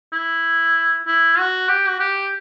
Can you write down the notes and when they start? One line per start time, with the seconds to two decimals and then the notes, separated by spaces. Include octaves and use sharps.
0.13 E4
1.07 E4
1.39 F#4
1.69 G4
1.88 F#4
2.00 G4